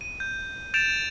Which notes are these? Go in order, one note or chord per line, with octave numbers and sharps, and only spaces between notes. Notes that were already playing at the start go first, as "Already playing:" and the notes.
D#7
G6
G6 A6 D7 E7 F7